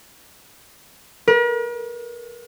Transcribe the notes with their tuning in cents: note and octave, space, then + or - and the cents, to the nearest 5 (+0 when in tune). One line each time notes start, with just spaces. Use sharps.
A#4 +45